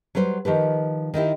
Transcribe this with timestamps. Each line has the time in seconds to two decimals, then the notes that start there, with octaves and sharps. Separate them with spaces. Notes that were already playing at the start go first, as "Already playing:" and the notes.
0.15 F#3 G3 B4 C5
0.45 D#3 F3 G4 B4
1.14 D#3 D#4 E4 G4